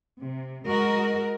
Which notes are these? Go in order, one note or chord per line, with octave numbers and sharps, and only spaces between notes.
C3
G#3 F#4 A#4 D#5